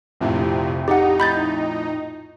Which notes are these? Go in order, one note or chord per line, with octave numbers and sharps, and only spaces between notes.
A#1 F2 A2 C3
D#4 G4 F#5
B5 G6 A6